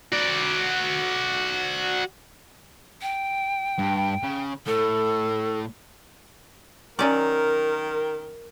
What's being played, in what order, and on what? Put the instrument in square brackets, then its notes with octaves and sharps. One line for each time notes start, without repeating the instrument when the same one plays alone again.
[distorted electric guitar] F#4 D5
[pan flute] G5
[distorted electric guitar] G2
C#3
[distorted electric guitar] A2 [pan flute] A4
[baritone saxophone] D#3 [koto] F#3 C#4 D5 [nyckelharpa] A#4